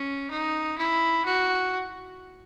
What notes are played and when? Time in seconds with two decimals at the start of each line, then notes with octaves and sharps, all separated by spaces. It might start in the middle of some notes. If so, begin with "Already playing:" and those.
Already playing: C#4
0.31 D#4
0.77 E4
1.25 F#4